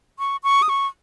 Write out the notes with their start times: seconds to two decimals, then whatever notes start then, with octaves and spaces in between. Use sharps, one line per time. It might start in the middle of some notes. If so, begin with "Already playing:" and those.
0.19 C#6
0.43 C#6
0.62 D#6
0.69 C#6